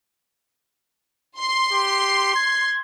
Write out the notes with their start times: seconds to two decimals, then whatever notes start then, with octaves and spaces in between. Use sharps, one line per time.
1.37 C6 C7
1.73 G4
2.36 G#6